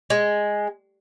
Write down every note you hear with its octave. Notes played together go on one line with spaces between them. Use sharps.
G#3